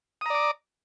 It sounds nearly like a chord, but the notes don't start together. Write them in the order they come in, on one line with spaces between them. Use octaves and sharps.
D#6 A#5 D5 D6